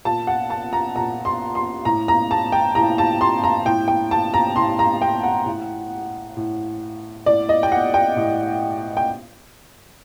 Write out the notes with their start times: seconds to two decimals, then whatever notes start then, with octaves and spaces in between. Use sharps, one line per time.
0.05 A#2 A5
0.27 F#5
0.50 A5
0.73 A#5
0.95 A#2 A#5
1.25 C6
1.55 C6
1.85 A2 A#5
2.08 A#5
2.31 A5
2.52 G5
2.75 A2 A#5
2.98 A5
3.21 C6
3.44 A#5
3.66 A2 G5
3.88 G5
4.11 A5
4.34 A#5
4.56 A2 C6
4.79 A#5
5.02 G5
5.23 F#5
5.46 A2
6.37 A2
7.26 A2 D5
7.49 D#5
7.63 G5
7.72 F#5
7.94 G5
8.16 A2
8.97 G5